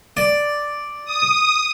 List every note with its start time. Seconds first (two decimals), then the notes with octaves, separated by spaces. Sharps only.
0.17 D5
1.05 D#6